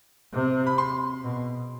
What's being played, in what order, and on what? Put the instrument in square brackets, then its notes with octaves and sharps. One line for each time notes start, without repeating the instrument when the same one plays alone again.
[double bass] C3
[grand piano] B5
C6
[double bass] B2